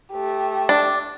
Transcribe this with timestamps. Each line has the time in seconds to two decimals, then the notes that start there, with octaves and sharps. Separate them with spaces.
0.12 A3 G4
0.69 D4